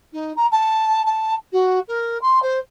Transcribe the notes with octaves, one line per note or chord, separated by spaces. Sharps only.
D#4
A#5
A5
A5
F#4
A#4
C6
C5